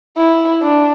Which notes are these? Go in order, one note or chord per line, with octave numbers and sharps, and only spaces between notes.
E4
D4